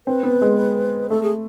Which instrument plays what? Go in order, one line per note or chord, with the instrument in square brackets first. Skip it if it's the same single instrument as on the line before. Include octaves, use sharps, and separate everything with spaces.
[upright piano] C4 [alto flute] B4
[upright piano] B3
G#3
[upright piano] A3 [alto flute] A4
[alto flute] G#4